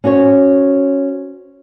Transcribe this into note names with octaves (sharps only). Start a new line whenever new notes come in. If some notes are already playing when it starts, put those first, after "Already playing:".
C#4 F#4 C5 C#5